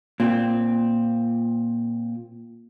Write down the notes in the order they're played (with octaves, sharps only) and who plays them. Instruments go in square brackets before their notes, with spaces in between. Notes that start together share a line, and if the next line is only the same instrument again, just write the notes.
[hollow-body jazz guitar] A#2 C4